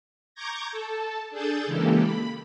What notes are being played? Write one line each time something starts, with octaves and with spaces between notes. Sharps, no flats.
A#5 C#6 D6 G6 G#6 A#6
A4 A5
D4 G#4 A4 G6 A6
C#3 E3 G#3 A#3 G4 A4
B5